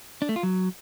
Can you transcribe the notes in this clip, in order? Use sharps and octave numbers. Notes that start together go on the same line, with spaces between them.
D4
A3
F4
F#3